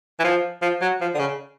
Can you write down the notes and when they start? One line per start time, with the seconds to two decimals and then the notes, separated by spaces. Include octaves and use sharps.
0.19 E3
0.24 F3
0.62 F3
0.82 F#3
1.01 F3
1.15 D3
1.19 C#3